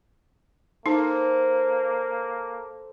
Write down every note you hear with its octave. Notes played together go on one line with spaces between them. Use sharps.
A#3 D#4 A4 C5